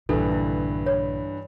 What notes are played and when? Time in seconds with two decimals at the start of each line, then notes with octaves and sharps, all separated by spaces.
0.09 A#1 G2 D3 E3 A4
0.32 E4
0.86 C#5